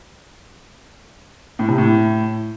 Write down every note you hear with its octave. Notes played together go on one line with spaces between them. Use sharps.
A2
C3
A2